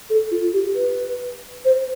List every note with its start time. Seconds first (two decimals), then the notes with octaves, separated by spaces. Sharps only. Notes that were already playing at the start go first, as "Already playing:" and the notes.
0.10 A4
0.31 F4
0.53 G4
0.76 B4
1.65 C5